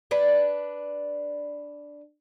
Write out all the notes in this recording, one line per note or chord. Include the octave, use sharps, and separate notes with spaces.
D4 B4